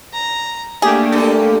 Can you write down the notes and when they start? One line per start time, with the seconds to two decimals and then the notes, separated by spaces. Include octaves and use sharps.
0.14 A#5
0.82 A3 A#3 D4 G4 G#4
1.12 G2 A4